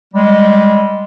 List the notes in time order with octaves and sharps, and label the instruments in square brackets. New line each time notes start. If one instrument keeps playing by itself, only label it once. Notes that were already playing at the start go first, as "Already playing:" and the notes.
[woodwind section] G3 G#3